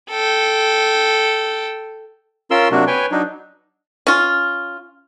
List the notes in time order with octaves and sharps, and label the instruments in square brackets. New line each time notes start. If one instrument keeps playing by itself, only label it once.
[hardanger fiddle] A4 G5
[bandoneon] C#4 F4 A#4 C6 E6
C3 F#3 A#3 D4 F#4
B4 C#5 G5 G#5
F#3 D4 D#4
[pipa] C#4 F4